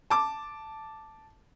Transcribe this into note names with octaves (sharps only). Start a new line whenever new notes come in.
A5 D6